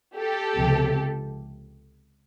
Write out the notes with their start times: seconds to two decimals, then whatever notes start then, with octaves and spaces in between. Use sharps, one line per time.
0.16 G4 A4
0.55 C#2 C3 F3